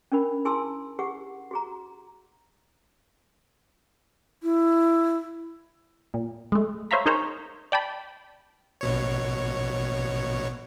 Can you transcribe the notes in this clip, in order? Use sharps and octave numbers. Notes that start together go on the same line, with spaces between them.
C#4 D4 A#4 B5
E4 G#4 G#5 A5 C6 E6
G4 G#4 F#5
F#4 G#4 A#5
E4
A#2
G#3 A3
C5 C#5 E5 F5 A#5 B5
D#4 G#4 A#4 C5 C#5 A#5
D5 G5 A5 B5
A#1 B2 C#5